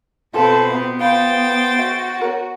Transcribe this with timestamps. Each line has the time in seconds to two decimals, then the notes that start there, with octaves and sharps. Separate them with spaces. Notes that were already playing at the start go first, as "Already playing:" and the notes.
0.34 B2 C4 F4 A4 B4 C5 A5
0.68 B3
0.99 F4 C5 F5 G5 B5 A6
1.79 F#4 E5
2.21 A#4 C#5